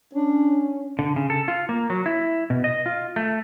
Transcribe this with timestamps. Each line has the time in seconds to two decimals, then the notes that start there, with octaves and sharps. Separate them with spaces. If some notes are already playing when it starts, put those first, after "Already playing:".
0.13 C#4 D4
0.99 D3
1.16 C#3
1.30 A4
1.48 F4
1.69 A#3
1.90 F#3
2.06 E4
2.50 B2
2.64 D#5
2.86 F4
3.16 A3